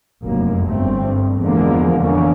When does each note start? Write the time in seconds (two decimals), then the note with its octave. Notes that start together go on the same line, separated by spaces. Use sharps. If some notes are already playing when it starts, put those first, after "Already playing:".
0.22 F1 F#2 A#3
0.66 G1 A3 C4
1.02 G2
1.42 E2 D3 F3 G#3 A#3
2.02 F2 D3 E3 A#3 C#4